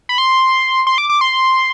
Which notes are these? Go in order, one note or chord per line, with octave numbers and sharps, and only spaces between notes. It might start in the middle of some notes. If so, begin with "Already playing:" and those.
B5
C6
C6
D6
D6
C6